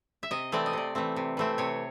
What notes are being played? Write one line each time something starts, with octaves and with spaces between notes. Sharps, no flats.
E5
C3 D#5
E3 A3 C4 D5
D#5
C3 D5
E3 A3 C4
C3
E3 A3 C4
C3 C#5